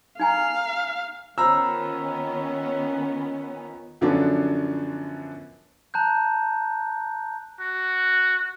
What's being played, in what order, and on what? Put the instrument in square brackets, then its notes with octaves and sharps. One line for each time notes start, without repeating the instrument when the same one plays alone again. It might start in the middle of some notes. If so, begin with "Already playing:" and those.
[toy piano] D#4 G#5 A#5 [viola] F5
[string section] D#3 B3 C#4 [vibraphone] F4 B5 [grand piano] C5 A#5 E6
[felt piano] F#2 D3 F3 F#3 B3 D4
[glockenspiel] A5 A#5 F#6 G6
[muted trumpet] F#4